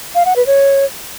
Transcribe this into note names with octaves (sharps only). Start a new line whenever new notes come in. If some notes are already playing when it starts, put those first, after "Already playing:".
F5
F#5
B4
C#5